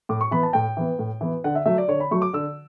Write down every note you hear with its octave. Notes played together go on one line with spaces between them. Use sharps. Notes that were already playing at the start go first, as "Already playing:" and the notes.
A2 D6
C#6
E3 B3 B5
A5
A2 G5
E3 B3
A2
E3 B3
D3 F#5
E5
F#3 A3 E5
D5
D3 C#5
B5
F#3 A3 C#6
D6
D3 E6